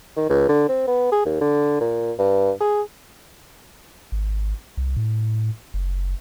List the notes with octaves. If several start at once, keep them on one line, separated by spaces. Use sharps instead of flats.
D#3
C#2
D3
C4
B3
G#4
D#2
D3
A#2
G2
G#4
G#1
C2
A2
F#1